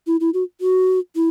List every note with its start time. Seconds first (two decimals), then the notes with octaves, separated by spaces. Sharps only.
0.07 E4
0.20 E4
0.34 F#4
0.61 F#4
1.16 E4